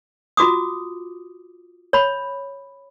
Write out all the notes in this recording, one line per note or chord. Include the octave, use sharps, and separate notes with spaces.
F4 F#4 D6 D#6
C#5 B5